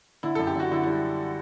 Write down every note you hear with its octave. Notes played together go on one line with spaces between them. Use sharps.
D3 E4
F#2 A4
G4
D3 F#4
D3 E4
E4
G3